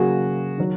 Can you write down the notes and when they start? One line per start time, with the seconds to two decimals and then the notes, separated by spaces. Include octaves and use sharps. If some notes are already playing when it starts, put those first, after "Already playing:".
Already playing: C#3 F#3 A#3 F#4 G#4
0.58 D#3 F#3